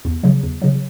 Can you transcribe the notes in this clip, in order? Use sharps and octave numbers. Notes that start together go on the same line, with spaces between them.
E2
C#3 F#3
E2
C#3 F#3